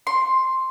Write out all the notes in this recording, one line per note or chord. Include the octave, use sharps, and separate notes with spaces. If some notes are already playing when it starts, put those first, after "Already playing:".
C6